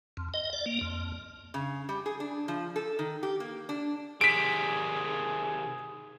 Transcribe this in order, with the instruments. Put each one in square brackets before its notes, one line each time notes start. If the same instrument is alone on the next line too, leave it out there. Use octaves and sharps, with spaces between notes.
[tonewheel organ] F2
D#5
D5
A#3
F2
[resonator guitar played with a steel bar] C#3
G3
G#4
D4
F3
A4
D#3
G4
A#3
D4
[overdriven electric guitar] C3 D#3 [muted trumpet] G#4 [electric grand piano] B6 D7